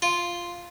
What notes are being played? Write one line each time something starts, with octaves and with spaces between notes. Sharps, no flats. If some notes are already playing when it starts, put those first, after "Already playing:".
F4